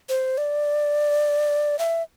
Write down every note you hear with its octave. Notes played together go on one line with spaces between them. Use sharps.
C5
D5
E5